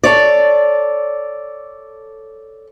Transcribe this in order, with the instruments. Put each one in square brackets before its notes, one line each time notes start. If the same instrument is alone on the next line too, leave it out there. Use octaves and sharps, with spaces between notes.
[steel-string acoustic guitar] A4 C#5 D5